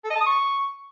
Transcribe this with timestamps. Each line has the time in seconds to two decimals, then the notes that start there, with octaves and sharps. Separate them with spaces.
0.05 A4
0.10 D#5
0.16 A5
0.21 D#6
0.26 C#6